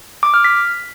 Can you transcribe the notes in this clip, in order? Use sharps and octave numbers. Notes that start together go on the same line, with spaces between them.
D6
F6
B6